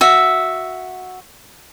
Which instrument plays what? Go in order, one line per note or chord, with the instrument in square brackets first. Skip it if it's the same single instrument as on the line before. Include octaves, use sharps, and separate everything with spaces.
[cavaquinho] F#4 E5